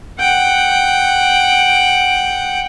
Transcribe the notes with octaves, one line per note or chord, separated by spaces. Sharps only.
F#5 G5